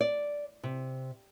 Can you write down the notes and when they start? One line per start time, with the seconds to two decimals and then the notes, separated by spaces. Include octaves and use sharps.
0.01 D5
0.63 C3